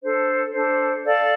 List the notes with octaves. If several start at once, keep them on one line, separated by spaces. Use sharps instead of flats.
D4 A4 C5
D4 A4 C5
A4 D5 F5 A5